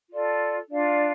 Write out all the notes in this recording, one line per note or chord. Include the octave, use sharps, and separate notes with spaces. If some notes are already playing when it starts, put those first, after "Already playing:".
F4 A4 D5
D4 F4 D5 F5